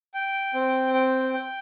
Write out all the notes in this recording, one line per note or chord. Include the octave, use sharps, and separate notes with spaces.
G5
C4
G5
G5